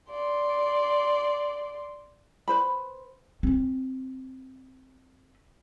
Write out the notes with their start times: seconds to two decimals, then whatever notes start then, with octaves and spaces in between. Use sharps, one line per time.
0.11 D5 C6
2.48 B4 C5 B5
3.43 C4 C#4